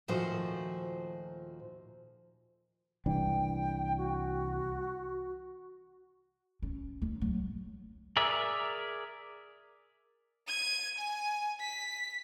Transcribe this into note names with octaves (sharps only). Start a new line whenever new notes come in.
D#2 A#2 F3 A3 F#4 C5
C2 E3 D4 G5
F#4
C#4
D#2
F#3
G#4 A#4 D5 E5
G#6 D#7
G#5
B6